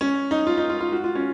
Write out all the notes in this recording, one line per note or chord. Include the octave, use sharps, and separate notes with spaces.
C#4
D#4
F4
D#4
F4
F4
F#4
F4
C#4